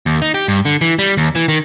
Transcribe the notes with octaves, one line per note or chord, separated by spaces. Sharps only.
D#2
D#4
G4
G2
D3
E3
G3
D#2
E3
D#3